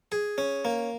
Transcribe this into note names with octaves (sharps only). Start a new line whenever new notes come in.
G#4
C#4
A#3